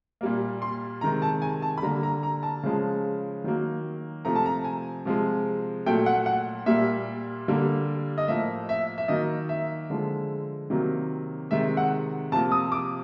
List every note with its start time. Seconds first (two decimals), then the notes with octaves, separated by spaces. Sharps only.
0.21 A#2 G3 A#3
0.62 C6
1.01 C3 D#3 G#3 A#5
1.22 A5
1.42 G#5
1.62 A5
1.78 B5
1.82 D3 G3 A#3 A#5
2.03 A#5
2.23 A#5
2.43 A5
2.63 C#3 F3 G#3
3.44 D#3 F#3 A#3
4.25 C3 F3 A3 A#5
4.36 A5
4.46 A#5
4.64 G#5
5.05 C3 F3 G#3
5.86 A#2 F#3 A3 G5
6.06 F#5
6.26 F#5
6.66 A#2 G3 A#3 E5
7.48 D3 G3 A#3
8.18 D#5
8.28 A2 F3 A#3 E5
8.69 E5
8.98 E5
9.08 D#3 F#3 A#3 D#5
9.49 E5
9.90 D3 F3 G#3
10.70 C3 D#3 F#3 A#3
11.51 C3 D#3 G#3 E5
11.77 F#5
12.32 C3 F3 A#3 A5
12.52 D#6
12.72 D6